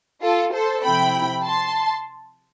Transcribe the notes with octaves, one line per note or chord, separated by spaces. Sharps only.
F4 A4
A4 C5
C3 F3 C4 E4 G5 B5
A5 C6